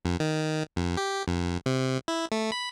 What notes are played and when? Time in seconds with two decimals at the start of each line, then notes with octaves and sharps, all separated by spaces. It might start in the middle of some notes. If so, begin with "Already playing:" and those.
0.05 F2
0.20 D#3
0.76 F2
0.97 G4
1.28 F2
1.66 C3
2.08 E4
2.32 A3
2.52 B5